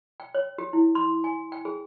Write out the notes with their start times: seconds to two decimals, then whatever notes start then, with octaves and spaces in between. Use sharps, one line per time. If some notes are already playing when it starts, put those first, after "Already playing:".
0.20 G5
0.35 C#5
0.58 G4
0.73 E4
0.95 C6
1.24 G#5
1.52 G5
1.65 G#4